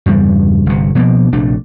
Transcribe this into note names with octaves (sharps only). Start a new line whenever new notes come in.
E2 G2 C#3 G3
G1 C3
B2 F3 A#3
A#1 C3 A3 D4